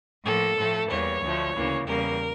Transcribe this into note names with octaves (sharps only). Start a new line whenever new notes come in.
A2 F3 A#3 A4
A2 F3 A3
E2 E3 G3 A#3 C#5
D2 D3 F3 A3
D2 C#3 E3 A#3
E2 C#3 G3 A#3 A#4